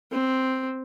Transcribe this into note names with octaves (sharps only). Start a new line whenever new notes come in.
C4